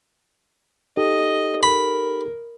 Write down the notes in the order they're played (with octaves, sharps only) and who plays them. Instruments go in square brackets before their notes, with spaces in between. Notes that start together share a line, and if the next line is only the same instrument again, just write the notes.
[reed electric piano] D#4 G4 A4 [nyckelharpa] D#5
[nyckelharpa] A#4 [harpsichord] B5